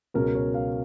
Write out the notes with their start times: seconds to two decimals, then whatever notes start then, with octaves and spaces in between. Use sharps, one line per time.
0.14 C#2 B2 F#3 C#4 A#4
0.35 C#5
0.54 F5